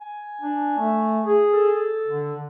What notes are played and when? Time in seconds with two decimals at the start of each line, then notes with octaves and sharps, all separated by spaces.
0.01 G#5
0.41 D4
0.79 A3
1.25 G#4
1.53 A4
2.07 D3